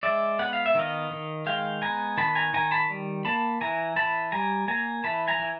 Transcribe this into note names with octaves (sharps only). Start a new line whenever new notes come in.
G#3 D5 E5
B3 F#5
F5
E5
D#3 D#5 F5
D#3
G#3 F5 G5
B3 G#5 A#5
D#3 A5 B5
G#5 A#5
D#3 G#5 A#5
A5 B5
G3
A#3 A5 B5
E3 G#5 A#5
E3 A5 B5
G3 G#5 A#5
A#3 G#5 A#5
E3 A5 B5
G#5 A#5
E3